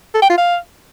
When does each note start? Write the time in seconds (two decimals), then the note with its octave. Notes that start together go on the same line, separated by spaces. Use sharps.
0.15 A4
0.22 G5
0.30 F4
0.37 F5